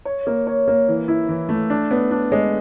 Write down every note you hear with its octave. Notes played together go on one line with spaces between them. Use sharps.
C#5
A#3
C#5
A#3
E3
E4
E3
A3
D4
B3
D4
G#3